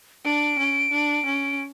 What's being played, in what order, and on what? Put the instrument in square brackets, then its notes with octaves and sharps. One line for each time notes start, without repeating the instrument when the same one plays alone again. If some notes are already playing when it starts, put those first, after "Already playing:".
[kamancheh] D4 [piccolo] D7
[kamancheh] C#4
D4
C#4